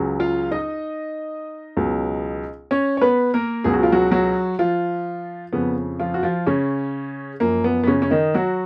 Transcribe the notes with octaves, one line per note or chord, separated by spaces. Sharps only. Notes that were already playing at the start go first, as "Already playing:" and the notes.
Already playing: C#2 C#3 F#3
F4 F5
D#4 D#5
C#2 B2 F#3
C#4 C#5
C#5
B3 B4
A#3 A#4
C#2 B2 F#3 G#4
F#4
F4
F#3 F#4
F#3 F#4
F3 F4
F2 C#3 F3 B3
F3 F4
F#4
F3 F4
C#3 C#4
F#2 F3 A#3
B3
B3
C#3 C#4
C#4
D#3 D#4
F#3 F#4